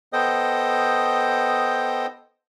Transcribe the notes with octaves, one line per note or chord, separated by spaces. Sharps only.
B3 A4 C5 D#5 G5 D#6